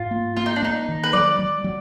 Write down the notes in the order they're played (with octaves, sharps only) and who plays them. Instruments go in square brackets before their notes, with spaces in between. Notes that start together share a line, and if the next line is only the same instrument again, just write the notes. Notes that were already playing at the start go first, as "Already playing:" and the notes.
Already playing: [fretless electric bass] G#2 [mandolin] F4
[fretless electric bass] A#3
[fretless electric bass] A#3 [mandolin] F4
[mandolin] D#4
D4
[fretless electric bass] A#3 [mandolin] D#4
[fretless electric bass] D#3
[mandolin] B4
[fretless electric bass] F#3 [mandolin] D5
[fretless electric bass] F#3
F#3